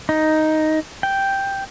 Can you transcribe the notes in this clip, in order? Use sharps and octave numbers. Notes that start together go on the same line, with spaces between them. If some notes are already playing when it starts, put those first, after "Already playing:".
D#4
G5